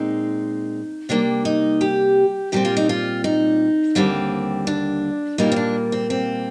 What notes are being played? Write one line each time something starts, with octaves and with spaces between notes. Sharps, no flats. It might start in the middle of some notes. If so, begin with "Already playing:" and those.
Already playing: A#2 G#3 C4 D#4
C3 G3 A#3 D4
D#4
G4
A#2 G3 C4 G4
F4
D#4
F4
D#4
D#2 D3 G3 A#3 C4
D4
A#2 G3 A#3 D#4
C4
D4
C4
C4